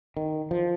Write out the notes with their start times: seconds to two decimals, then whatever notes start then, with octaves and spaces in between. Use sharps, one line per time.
0.17 D#3
0.51 F3